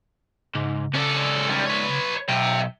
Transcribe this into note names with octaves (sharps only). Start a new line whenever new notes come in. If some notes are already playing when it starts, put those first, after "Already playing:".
G#2 C#3
C#2 C#4 A4 D5
G3 C#4
B4 C#5
B1 E5 G5